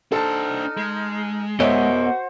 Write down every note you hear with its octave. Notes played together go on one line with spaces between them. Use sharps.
D4 D#4 A4 C5 A5 F6
G#3
B3 F#4 A#4 C5 C#5 D#5 E5 F#5